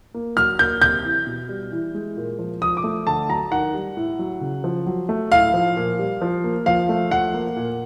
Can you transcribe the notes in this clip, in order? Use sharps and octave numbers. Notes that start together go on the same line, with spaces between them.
A#3
F#3 F6
A#3 G6
C3 G6
E3
B2
G3
E3
G#3
A#2
F3
F3 D#6
D6
A3
D3 A5
F#3 A#5
D#3 F#5
G3
A2
F#3
C#3
F3
F#3
A3
A2 F5
F3
A#2
G3
F3
A#3
F3 F5
A3
F3 F#5
A#3
A#2